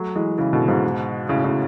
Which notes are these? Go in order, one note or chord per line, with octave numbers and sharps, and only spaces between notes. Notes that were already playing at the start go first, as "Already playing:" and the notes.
Already playing: F#3 A3
E3 G#3
C#3 E3
B2 D3
G#2 B2
A2 C#3
A2 C#3